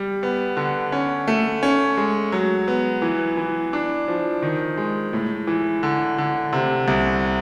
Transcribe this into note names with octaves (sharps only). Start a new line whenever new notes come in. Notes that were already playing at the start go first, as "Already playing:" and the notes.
Already playing: G3
B3
D3
C#4
A3
C#4
G#3
F#3
B3
E3
E3
D4
F3
D#3
G#3
A2
E3
D3
D3
C3
C2